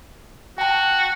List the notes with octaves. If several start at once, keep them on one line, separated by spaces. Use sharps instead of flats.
F#4 G5 A5